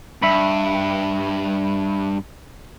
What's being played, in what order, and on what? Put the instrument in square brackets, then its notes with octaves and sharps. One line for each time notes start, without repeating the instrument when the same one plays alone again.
[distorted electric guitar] G2 [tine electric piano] E5 B5